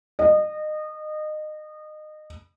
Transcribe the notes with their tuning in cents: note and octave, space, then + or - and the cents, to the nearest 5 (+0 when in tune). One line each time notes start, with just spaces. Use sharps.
D#5 -25